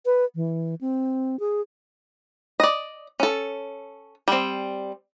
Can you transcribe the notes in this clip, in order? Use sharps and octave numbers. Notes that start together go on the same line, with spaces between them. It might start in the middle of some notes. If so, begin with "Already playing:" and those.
B4
E3
C4
G#4
D5 D#5
C#4 A4
G3 C4